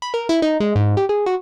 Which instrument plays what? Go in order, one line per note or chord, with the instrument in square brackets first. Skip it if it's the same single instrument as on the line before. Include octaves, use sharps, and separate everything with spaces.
[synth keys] B5
A#4
E4
D#4
G#3
G#2
G4
G#4
F#4